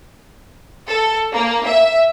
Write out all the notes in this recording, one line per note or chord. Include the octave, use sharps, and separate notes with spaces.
A4
A#3
E5